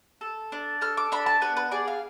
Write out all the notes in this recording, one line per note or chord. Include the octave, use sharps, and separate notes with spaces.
A4
D4
A4 F6
D6
D4 B5
A5
B3 B4
B4
G#4 D5
F5